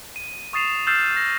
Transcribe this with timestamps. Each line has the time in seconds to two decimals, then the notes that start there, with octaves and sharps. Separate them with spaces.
0.16 D#7
0.53 C#6 D#6 A6 C7 E7 F7
0.87 E6 F6 G6 A6 C7 E7
1.17 A#6